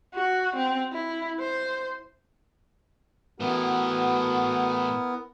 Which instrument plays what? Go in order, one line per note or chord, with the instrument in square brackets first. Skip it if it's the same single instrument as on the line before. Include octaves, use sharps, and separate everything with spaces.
[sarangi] F#4
C4
E4
C5
[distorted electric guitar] A2 E3 [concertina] B3 [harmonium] E4 A#4 [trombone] F#4